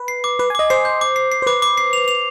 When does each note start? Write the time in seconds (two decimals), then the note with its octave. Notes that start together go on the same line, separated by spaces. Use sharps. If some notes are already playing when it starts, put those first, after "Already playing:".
Already playing: B4
0.08 C7
0.24 D6
0.39 B4 D6
0.50 G#5
0.55 D#5 D6
0.70 C5 C7
0.85 G6
1.01 D6
1.16 C7
1.32 C7
1.42 C5
1.47 B4 D6
1.62 D6
1.77 C7
1.93 F7
2.08 F7